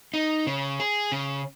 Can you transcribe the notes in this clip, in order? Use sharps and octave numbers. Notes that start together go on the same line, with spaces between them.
D#4
C#3
G#4
C#3